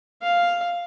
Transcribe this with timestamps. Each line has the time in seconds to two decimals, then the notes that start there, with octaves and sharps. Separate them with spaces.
0.22 F5